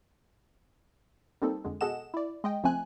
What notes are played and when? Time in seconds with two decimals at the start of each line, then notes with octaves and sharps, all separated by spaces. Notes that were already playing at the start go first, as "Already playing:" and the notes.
1.42 G3 A#3 C4 D#4 A4
1.65 F2 D3 G#3
1.81 B2 G#4 A4 D#5 F#5 E7
2.14 E4 D5
2.44 G#3 D#5 G5
2.63 C#2 F3 A3 C4 G#5 F#6